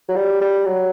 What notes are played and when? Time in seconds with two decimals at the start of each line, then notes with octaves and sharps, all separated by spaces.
0.09 F#3
0.16 G3
0.41 G3
0.65 F#3